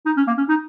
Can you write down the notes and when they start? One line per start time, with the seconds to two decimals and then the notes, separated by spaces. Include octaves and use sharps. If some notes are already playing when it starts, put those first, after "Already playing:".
0.06 D#4
0.17 C#4
0.27 A#3
0.37 C#4
0.49 D#4